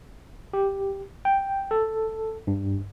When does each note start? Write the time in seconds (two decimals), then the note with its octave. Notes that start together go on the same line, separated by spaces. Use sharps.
0.53 G4
1.25 G5
1.71 A4
2.47 G2